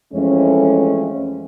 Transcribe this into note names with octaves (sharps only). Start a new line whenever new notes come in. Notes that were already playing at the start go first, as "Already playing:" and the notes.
F2 E3 G#3 A3 C#4